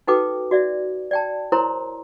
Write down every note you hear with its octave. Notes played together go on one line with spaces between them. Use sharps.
D#4 F#4 A4 B4 G5 D6
F#4 D5 E5
D5 G5 A5
E4 A#4 C5 C#5 A#5 C6